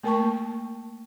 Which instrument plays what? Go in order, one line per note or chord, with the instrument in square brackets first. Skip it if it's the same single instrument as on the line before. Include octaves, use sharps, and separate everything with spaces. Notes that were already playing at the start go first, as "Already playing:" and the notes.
[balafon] A3 A#3 A#4 G5 A5 C#6